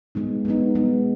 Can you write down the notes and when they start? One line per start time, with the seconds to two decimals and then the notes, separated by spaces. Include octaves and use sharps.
0.15 G#3 B3 D#4
0.45 G#3 B3 D#4
0.75 G#3 B3 D#4